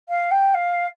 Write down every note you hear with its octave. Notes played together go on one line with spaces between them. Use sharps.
F5
G5
F5